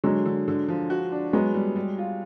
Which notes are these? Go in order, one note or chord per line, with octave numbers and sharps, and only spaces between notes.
D3 F#3 G#3
D3
D3
F3
F#4
D4
F#3 G#3 B3
G3
G3
F4